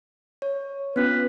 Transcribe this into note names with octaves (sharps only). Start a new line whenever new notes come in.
C#5
B3 C#4 F4 B4